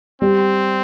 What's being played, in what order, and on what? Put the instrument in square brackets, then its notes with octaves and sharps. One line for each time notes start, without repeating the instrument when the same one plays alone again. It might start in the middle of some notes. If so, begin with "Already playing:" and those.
[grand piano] G3 [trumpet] C4